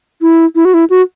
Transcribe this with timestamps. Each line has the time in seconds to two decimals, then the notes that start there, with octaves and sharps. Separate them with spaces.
0.22 E4
0.55 E4
0.65 F#4
0.74 E4
0.90 F#4